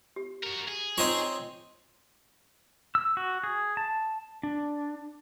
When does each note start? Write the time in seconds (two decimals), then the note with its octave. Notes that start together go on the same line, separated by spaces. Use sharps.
0.16 G4
0.43 F#4 A#4
0.68 G#4
0.98 C4 D#4 F4 C5 C#5 D#5
2.95 E6
3.17 F#4
3.44 G#4
3.77 A5
4.43 D4